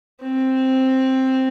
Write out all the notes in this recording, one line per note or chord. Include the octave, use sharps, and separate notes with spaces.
C4